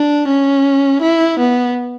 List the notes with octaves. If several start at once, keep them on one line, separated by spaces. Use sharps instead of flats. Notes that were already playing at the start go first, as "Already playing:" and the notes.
Already playing: D4
C#4
E4
B3